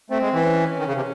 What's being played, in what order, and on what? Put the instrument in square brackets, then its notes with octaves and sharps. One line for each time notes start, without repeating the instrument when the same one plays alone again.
[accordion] A3 [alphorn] C4
[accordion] G#3
E3
[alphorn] C#4
[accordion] D#3
C#3
C3